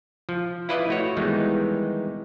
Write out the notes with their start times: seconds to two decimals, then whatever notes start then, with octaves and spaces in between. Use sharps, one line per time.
0.29 F3
0.69 E4 F4 B4 D5 D#5
0.89 A3 F#4 C#5
1.17 D#3 E3 G3 G#3 B3 D#4